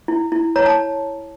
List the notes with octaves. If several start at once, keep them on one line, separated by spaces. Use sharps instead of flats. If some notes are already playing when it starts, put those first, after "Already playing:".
E4
E4
C#5 A#5
A5